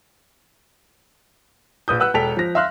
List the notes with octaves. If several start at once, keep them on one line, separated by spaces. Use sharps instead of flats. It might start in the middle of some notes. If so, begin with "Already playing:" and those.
A#1 B4 D#6 G6
B4 F#5 E6 F#6
E1 A4 G5 B6 F7
F3 A#6
E5 F5 C6 F6 F#6